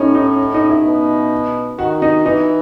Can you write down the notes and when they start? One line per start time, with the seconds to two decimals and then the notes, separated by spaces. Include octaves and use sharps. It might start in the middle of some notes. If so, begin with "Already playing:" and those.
Already playing: A2 C#4 D#4
0.15 D#4
0.54 D#4
0.69 E4
0.84 B2
1.79 D#3 F#4
2.02 D#4
2.25 E3 D#4